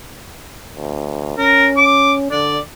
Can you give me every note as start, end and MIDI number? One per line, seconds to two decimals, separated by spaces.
0.76 1.37 38
1.38 2.30 61
1.38 1.67 70
1.77 2.13 86
2.31 2.58 50
2.31 2.58 74